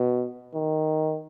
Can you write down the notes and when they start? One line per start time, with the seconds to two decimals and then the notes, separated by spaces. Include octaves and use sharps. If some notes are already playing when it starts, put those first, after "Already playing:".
Already playing: B2
0.55 D#3